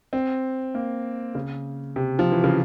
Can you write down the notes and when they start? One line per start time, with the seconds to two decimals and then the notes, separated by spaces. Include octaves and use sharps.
0.13 C4
0.74 A#3
1.35 C#3
1.96 C3
2.19 F3
2.32 E3
2.44 C#3